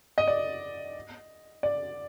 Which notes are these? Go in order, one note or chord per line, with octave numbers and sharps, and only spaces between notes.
D#5
D5
D5